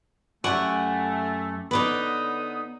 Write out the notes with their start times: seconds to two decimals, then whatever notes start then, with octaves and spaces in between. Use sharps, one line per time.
0.44 F#2 A3 G4 F#5 G#5 C#6
1.71 D3 B3 D#4 B4 C#5 D6 D#6